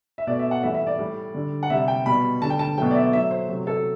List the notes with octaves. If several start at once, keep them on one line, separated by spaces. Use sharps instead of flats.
E5
B2 A3 D5
E5
F#5
A2 E3 G3 E5
E5
D5
A2 G3
D3 G3
F#5
C3 G3 E5
G5
B2 G3 B5
D3 G3 A5
G5
A5
B2 F#3 A3 G5
D5
E5
A2 F#3 A3 E5
C5
C3 F#3 A3
A4